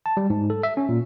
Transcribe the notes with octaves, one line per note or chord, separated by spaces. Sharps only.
A5
G3
G#2
A4
E5
C#4
A#2